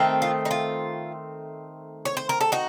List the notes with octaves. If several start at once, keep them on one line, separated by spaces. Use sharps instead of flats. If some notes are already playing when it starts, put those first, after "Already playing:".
Already playing: D#3 A3 C4
F4
D#4
F4
C#5
C5
A#4
A4
D#4 F#4